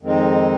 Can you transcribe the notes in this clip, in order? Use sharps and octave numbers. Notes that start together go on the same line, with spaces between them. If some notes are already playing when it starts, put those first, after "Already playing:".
F2 D#3 G#3 C4 D#4